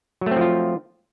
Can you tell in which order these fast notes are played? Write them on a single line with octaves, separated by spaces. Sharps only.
F#3 A3 C4 F3 F4